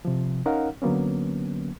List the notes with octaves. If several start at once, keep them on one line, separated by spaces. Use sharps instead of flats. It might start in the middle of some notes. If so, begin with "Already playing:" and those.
C3 F3
C#4 D#4 A#4 F5 F#5
D3 F#3 A#3 B3 C#4